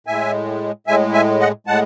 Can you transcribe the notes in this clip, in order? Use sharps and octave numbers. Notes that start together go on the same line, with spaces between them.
A2 G#3 E5 G#5
A2 G#3 E5 G#5
E5 G#5
D#5 F#5
A2 G#3 F#5 A5